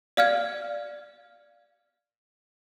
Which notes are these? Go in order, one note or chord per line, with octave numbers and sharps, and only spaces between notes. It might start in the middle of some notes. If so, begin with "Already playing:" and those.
D5 F5 F6 G#6